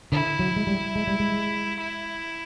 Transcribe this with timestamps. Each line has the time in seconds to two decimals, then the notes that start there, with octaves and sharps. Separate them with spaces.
0.12 D3 E4
0.39 F#3
0.56 G#3
0.67 G3
0.96 G#3
1.07 G3
1.20 G#3
1.79 E4